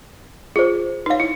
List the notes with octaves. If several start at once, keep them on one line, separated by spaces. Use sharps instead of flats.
F4 G#4 C5
D#4 B4 C#5 F5
E4